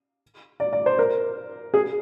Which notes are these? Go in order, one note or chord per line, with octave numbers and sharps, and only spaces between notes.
D5
D5
C5
A#4
G#4